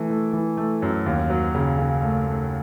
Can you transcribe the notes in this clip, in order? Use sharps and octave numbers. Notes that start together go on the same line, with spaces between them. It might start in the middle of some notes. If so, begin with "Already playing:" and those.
Already playing: E3 A3
A3
E3
A3
F#2
D#2
F#3
C#3
C#3
A3
A3